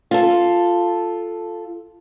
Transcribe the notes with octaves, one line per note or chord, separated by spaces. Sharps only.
F4 A4